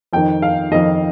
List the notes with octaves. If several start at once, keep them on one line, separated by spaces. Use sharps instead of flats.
F2 D#3 G5
F5
F2 D#3 D#5